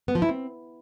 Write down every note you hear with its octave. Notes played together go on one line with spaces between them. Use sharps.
B3
F3
E4
C4